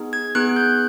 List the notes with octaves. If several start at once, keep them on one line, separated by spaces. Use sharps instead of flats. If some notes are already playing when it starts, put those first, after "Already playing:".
Already playing: B3 D#4 G#4
G#6
B3 D#4 G#4 F#6
G6